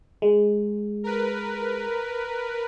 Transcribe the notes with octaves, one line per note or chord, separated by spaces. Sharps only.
G#3
A#4 B4